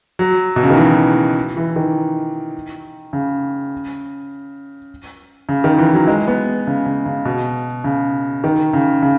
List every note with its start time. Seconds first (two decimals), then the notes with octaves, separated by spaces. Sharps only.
0.19 F#3
0.56 B2
0.63 C#3
0.70 D#3
0.77 E3
1.57 E3
1.76 D#3
3.13 C#3
5.49 C#3
5.64 D#3
5.78 E3
5.94 F#3
6.07 G#3
6.28 B3
6.67 C#3
6.86 C#3
7.06 C#3
7.25 B2
7.84 C#3
8.44 D#3
8.73 C#3
9.03 C#3